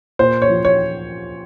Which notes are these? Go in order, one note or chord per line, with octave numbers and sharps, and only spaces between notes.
A#2 C5
C#5
F3
C#5